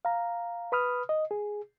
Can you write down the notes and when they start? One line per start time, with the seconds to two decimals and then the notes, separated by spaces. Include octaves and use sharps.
0.05 F5 A#5
0.72 B4 B5 D#6 F6
1.09 D#5
1.31 G#4